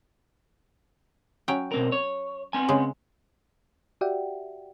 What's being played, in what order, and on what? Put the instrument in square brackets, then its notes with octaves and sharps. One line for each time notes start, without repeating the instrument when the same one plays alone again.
[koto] F#3 C#4 G5
[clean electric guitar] B2 C4 A#4
C#5
B3 C4 G#5
[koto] C#3 G#3
[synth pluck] F#4 G4 D5 E5 F#5 G5